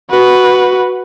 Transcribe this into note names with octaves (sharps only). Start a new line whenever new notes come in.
F#4 B4